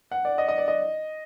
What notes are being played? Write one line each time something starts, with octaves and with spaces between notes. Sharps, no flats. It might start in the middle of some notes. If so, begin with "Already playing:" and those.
F#5
D5
D#5
D#5
D5
D#5